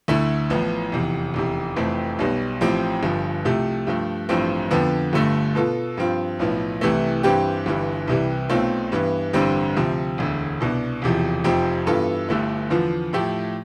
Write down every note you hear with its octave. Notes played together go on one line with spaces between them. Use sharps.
D2 D3 A3 E4
A1 A2 F3 B3
F1 E2 C3
F1 E2 C3
F1 F2 E3 A3 C4
B1 B2 G3
A1 A2 F3 C4 G4
G1 G2 F3
C2 C3 F3 A3
G2 F3 A3
A1 G2 F3 A3 C4
F2 D3 F3 B3
G1 G2 D3 A3
B2 B3 F4 A4
G2 F3 C4 F4
B1 A2 F3 B3
C2 C3 E3 A3
G2 E3 G3 C4 G4
G1 G2 E3 G3
C2 C3 E3 G3
B1 B2 A3 C4 F4
G2 E3 B3
A1 G2 D3 G3 C4
D2 C3 F3 C4
E1 D2 D3
C2 B2 B3 D4
E1 E2 C3 F3
F1 F2 C3 F3 C4
G2 E3 B3 F4 A4
G1 G2 D3 A3 E4
E2 D3 F3 B3 F4
A2 F3 A3 E4 G4